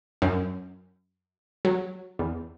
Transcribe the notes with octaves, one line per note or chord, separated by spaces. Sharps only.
F#2
F#3
E2